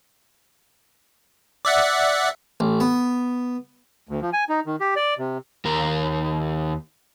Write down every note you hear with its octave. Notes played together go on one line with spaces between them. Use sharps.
D5 E5 F#5
A1
B3
D2
F3
G#5
D#4
D#3
G4
D5
C3
D#2 A#4